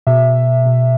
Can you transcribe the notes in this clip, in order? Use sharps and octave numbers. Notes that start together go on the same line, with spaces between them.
B2 E5
B2